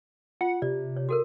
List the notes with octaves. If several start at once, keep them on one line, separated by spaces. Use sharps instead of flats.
F4 F#5
C3 D5
C#5
F#4 A4 A#4